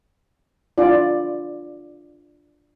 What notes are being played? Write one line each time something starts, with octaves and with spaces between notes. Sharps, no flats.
D4 E4 F4 D5